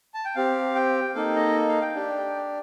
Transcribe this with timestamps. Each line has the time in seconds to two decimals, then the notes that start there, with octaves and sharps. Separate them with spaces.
0.14 A5
0.25 G5
0.36 C4 G4 F5
0.75 G5
1.15 A#3 D#4 A4 F5
1.36 D#5
1.69 F5
1.82 G5
1.95 D4 G4